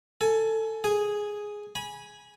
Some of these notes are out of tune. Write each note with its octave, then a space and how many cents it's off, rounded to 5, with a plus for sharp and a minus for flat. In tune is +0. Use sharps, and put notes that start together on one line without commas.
A4 +15 G#5 +30
G#4 +0 G#5 -5
G#5 +0 B5 -30